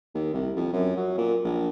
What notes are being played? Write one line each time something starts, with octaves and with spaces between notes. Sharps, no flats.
D#2
C2
F2
F#2
F#3
A#2
A#1